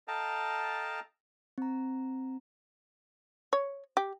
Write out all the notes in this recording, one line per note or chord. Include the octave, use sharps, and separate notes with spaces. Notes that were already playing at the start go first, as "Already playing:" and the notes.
A4 D#5 F5 G5 A5 A#5
C4 A#5
C#5
G4